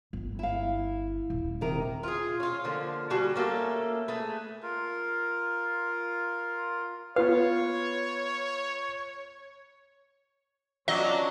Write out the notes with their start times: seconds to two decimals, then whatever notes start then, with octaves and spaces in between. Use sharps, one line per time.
0.13 G1
0.39 E4 F5
1.30 D#1
1.61 C3 D#3 A#4
2.03 F4 G4 G#4
2.40 C#4 F4
2.65 D3 F3 A#3
3.10 G3 F#4 G#4 A5
3.36 A3 A#3 C#4 A4
4.08 A3 G#4 B4
4.63 F4 A#4
7.16 B3 F4 B4 C#5 F5
10.88 F#3 C#4 D4 F4 F#4 D5 D#5